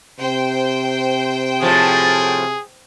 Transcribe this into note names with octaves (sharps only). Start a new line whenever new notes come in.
C3 C5 G5
A2 F3 G#4